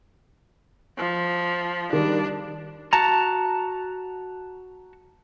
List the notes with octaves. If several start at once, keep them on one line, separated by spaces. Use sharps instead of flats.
F3
D#3 G3 D4
F#4 A5 A#5